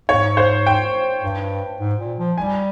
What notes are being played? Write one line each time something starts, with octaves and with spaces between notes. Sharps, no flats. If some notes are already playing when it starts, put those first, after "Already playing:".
G#2 C#5
C5
G5
G2
G#2
A#2
F3
G3 G#5